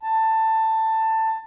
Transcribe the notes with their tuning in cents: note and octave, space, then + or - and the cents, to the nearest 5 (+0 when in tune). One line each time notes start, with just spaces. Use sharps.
A5 +15